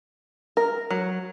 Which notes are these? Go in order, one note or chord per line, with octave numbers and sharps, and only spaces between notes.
A#4
F#3